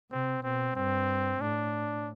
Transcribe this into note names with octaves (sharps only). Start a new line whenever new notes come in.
C3 C4
B2 C4
G2 C4
A2 D4